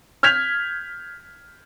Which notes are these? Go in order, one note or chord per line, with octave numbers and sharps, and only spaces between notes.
F6 G6 G#6 B6 F7